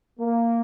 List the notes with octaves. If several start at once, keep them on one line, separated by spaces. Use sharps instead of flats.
A#3